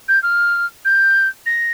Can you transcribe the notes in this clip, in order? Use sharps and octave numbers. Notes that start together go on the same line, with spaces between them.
G6
F6
G6
A#6